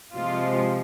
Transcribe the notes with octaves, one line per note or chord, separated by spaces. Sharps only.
C3 F3 G#3 F4